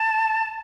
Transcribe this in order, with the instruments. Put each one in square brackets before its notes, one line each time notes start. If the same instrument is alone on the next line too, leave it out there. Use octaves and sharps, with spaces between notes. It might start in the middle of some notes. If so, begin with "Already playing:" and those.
Already playing: [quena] A5